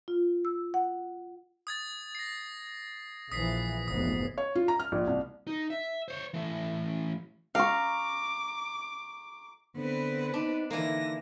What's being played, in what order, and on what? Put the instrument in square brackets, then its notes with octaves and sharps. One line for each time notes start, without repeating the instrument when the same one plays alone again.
[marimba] F4
E6
F#5
[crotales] D#6 G#6 A6
A#6 C7
[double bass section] A#1 E3 [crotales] D#6 B6 C7
[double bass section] F1 G#2 B3 [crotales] D#6
[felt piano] C#5
F4
A#5
F6
A#1
C2
[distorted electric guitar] D#4
E5
C5 C#5
E3 A3
[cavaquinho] F5 [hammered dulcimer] A#5 C#6 [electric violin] D6
[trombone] D3 [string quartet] B3 C4 B4
[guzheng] D4 [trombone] D#4
[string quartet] D3 A#6 [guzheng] E3 A#3 [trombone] D#4